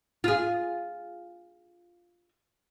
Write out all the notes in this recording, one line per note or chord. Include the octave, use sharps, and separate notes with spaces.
F4 G#4